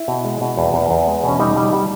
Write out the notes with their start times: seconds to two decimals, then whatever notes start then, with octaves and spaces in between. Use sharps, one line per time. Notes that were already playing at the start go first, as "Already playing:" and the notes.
Already playing: E4
0.08 B2
0.25 G#3
0.41 B2
0.57 E2
0.74 E2
0.91 E2
1.08 G#3
1.24 B2 C#4
1.39 G3 D#4
1.57 G3
1.73 G3